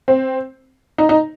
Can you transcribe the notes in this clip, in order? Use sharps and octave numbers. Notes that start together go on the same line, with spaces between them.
C4
D#4
D#4